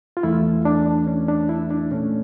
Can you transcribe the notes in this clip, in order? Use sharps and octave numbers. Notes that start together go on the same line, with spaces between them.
F4
E2 E3 A3 E4
D4
C#4
D4
E4
D4
A#2 A3 C#4